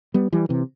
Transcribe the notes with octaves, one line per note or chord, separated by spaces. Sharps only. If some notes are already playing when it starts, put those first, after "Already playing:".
G3 B3
E3 G3
C3 E3